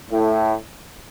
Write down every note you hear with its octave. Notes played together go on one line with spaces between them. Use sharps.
A2